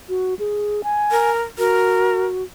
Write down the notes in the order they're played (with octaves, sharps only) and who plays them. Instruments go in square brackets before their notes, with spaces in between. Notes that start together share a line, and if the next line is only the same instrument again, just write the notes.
[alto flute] F#4
G#4
G#5
[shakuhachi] A#4
[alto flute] F#4 [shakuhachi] A#4